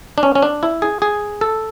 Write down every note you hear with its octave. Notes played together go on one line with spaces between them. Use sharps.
D4
C#4
C#4
D4
E4
G#4
G#4
A4